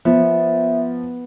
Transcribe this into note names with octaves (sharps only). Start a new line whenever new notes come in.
F3 B3 E5